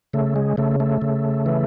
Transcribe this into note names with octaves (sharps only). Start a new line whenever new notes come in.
C#3 A3
G#3
C#3 A3
A3
C#3
E3